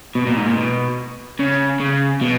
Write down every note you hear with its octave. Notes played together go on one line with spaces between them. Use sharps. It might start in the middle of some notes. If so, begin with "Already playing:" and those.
B2
A#2
G#2
A#2
B2
C#3
C#3
B2